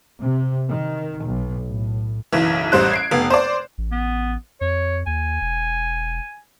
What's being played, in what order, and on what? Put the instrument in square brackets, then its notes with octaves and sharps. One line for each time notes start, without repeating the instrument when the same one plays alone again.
[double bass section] C3
D#3
B1
A2
[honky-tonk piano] F#1 B1 E3
A1 G3 C5 F#6
G#6 C7 D7
F1 B3
C5 D5
[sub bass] A1
[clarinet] B3
[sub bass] F2 [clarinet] C#5
[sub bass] D#2 [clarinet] G#5
[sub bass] E1